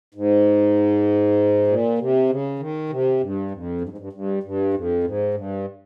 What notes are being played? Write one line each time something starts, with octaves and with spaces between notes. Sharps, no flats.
G#2
A#2
C3
C#3
D#3
C3
G2
F2
G2
G#2
G2
G2
G2
F2
G#2
G2